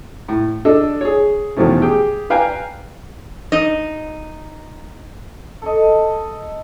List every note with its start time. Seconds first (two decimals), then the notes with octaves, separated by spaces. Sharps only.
0.29 A2
0.65 D4 A4 D#5
1.01 G#4 C#5
1.57 E2 B2 D#3 F3 A3 C#4
1.82 G4 G#4 G5
2.30 B4 F5 G5 G#5 A#5
3.52 D#4 D#5
5.62 A4 D#5